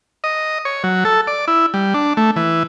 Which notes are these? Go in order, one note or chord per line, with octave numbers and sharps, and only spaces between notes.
D#5
C#5
F#3
A4
D5
E4
G3
D4
A3
E3